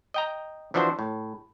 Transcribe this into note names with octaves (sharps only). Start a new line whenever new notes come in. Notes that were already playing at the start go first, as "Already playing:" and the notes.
D#5 G5 A#5
E3 F3 D4 F#4 C5
A2